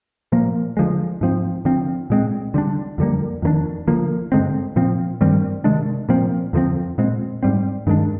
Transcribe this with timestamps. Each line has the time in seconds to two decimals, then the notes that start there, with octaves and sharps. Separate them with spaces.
0.32 A#2 F3 A#3
0.77 D3 F3 G#3
1.21 G#2 F3 C4
1.65 D3 F3 C4
2.10 A#2 G#3 C4
2.54 D3 G3 D4
2.98 F2 D3 G3 A#3
3.42 F2 D#3 A#3 D4
3.88 D3 F3 A#3
4.32 G2 D3 G#3 C4
4.76 A#2 F3 C4
5.21 G2 D#3 G3 C4
5.64 C3 D#3 G#3 D4
6.09 A#2 F3 C4
6.53 F2 D3 F3 C4
6.98 A#2 G#3 C4
7.43 G#2 G3 C4
7.87 G2 D#3 G#3 D4